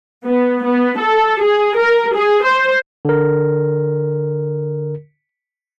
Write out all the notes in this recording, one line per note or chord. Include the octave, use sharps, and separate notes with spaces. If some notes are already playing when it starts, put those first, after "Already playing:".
B3
B3
A4
G#4
A#4
G#4
C5
D3 A#4